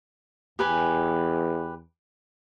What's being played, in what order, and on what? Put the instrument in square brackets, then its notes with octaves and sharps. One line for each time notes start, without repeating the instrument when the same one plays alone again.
[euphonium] E2 [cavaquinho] G4 B4 G#5